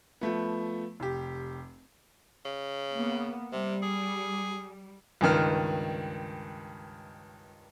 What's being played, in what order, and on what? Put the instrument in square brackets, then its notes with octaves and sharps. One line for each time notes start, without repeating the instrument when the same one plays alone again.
[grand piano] F3 A3 B3
F1 G4
[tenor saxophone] C#3
[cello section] A#3 B3
[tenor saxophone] C3 [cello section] G3
[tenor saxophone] G#4
[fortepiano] C#2 G2 D#3 F6